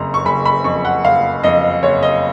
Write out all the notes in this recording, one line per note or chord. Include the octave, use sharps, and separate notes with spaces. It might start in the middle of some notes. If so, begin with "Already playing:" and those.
Already playing: F#1 F2 A#5
C#6
F#1 B5
B5
F2 C#6
F#5
F#1 F5
F2 D#5
F#1 C#5
D#5